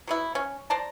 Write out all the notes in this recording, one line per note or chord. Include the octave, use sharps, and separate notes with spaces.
F#3 B3 E4
C#4
C5 D5 A5 A#5